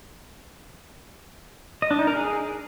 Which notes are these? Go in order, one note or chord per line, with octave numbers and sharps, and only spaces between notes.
D#5
D4
D#4
A#4
G#4